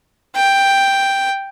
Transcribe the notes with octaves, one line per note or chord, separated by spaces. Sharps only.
G5